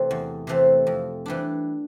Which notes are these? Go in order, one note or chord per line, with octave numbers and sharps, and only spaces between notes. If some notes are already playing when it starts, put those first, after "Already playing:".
Already playing: C3 E3 A3 C4
E2
C3 E3 A3 C4
F2
E3 G3 D4